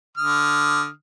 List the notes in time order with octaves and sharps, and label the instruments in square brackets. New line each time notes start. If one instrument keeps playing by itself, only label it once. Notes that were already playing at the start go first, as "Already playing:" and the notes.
[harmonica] D3 D#6 F6